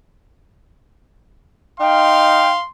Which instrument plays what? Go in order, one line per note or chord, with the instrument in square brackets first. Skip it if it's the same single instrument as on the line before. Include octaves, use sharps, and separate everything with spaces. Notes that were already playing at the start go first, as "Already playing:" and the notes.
[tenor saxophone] D#4 [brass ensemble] F5 [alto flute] G5 [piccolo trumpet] C6